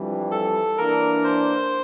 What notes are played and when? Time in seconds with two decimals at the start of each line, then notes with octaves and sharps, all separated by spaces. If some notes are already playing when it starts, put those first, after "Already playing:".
Already playing: F2 E3 G3 D4
0.31 A4
0.77 E3 A#3 D4 A#4
1.24 C5